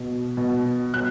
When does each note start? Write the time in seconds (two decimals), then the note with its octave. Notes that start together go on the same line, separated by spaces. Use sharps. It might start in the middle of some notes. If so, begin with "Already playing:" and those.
Already playing: B2
0.37 B2
0.94 B2 F#6